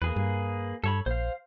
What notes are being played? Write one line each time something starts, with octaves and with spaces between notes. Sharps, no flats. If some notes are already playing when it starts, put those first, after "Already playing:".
E2 A#3 G#4 B4
G2
G2 A4 C#5 B5
A#1 C5 F5